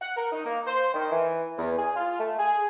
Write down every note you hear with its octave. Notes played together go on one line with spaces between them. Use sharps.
F#5
A#4
D#4
A#3
C5
D#3
E3
E2
G#4
F4
A3
G#4